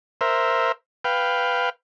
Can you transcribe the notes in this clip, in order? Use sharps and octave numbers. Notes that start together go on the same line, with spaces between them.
A#4 C5 E5
B4 F5 G5